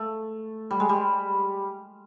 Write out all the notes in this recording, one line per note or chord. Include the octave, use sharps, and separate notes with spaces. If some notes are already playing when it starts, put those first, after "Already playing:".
Already playing: A3
G3
G#3
G3